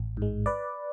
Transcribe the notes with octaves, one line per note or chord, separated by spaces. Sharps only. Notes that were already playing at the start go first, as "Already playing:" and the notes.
Already playing: A1
G#2 G#3
B4 D5